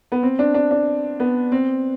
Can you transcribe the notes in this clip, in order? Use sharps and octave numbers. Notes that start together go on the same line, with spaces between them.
B3
C4
D4
D4
D4
B3
C4